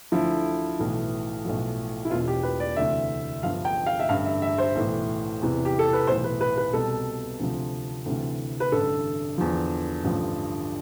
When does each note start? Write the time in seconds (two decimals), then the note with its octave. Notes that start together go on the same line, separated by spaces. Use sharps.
0.12 D2 D3 F3 E4
0.79 B1 A2 E3
1.45 B1 A2 F3
2.05 E4
2.10 E1 E2 B2 F4
2.28 G4
2.43 B4
2.60 D5
2.76 D2 C3 E3 E5
3.43 G1 G2 F3 F5
3.65 G5
3.86 F5
3.99 E5
4.09 A1 G2 D3 F5
4.25 E5
4.42 E5
4.58 C5
4.75 B1 A2 E3
5.42 E2 C3 E3
5.65 G4
5.79 A4
5.93 B4
6.07 B1 A2 E3 C5
6.24 B4
6.41 B4
6.58 B4
6.73 C2 B2 A4
7.40 D2 C3 F3
8.06 D2 C3 E3
8.60 B4
8.72 A1 G2 D3 A4
9.38 E2 D3 F3
10.04 A1 G2 D3 F3